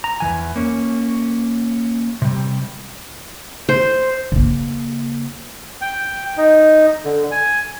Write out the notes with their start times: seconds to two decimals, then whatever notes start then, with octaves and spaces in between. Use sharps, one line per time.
0.04 A#5
0.20 E2 E3 G#5
0.56 A#3 C#4
2.22 C3 G3
3.69 C5
4.32 C#3 A#3
5.81 G5
6.37 D#4
7.05 D3
7.31 G#5